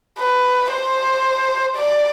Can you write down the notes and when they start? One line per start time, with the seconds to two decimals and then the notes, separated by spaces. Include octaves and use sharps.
0.19 B4
0.72 C5
1.76 D5